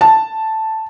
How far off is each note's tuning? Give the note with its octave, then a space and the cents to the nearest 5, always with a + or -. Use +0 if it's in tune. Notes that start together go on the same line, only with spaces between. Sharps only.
A5 +0